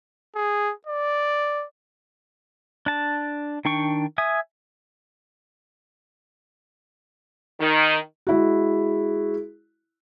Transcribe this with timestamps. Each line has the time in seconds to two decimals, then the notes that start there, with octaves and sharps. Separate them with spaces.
0.36 G#4
0.87 D5
2.86 D4 A5
3.65 D#3 D4 G5 C#6
4.18 E5 G#5 D#6
7.60 D#3
8.27 G#3 E4 F#4